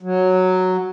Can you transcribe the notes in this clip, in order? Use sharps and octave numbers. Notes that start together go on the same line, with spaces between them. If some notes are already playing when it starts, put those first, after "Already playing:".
F#3